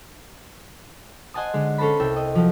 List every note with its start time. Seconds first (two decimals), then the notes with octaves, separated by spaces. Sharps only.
1.34 C5 D#5 F#5 G#5 A5 D#6
1.54 D3 G#3
1.78 C#4 A4 C5 A5 B5
2.00 C2 E5 G5 A6
2.16 D#5
2.35 F3 F#3 G4